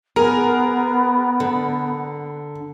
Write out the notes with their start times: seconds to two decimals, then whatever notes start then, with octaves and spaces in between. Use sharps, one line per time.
0.16 B3 G#4 A#4
1.40 D3